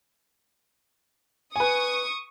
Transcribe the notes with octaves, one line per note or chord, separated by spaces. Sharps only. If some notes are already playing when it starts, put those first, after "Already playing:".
B4 G#5 C#6 D#6